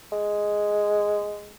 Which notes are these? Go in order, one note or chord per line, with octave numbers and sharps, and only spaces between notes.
G#3